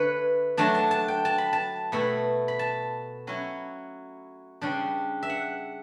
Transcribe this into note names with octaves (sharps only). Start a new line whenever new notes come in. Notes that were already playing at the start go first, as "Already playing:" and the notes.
Already playing: D3 A3 E4 B4 C#5
F#3 A3 D4 A5
A5
A5
G5
A5
B5
A5
B2 A3 E4 B5
B5
A5
F#3 C#4 E4
C#3 G3 D4 G5
E5
F#5